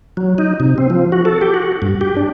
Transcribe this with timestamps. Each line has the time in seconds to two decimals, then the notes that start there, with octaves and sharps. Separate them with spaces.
0.17 F#3
0.38 D#4
0.60 C3
0.78 C4
0.90 F3
1.12 F#4
1.25 A4
1.41 G4
1.54 F#4
1.82 G2
2.01 G4
2.17 D4